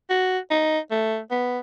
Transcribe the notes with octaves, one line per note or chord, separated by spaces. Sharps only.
F#4
D#4
A3
B3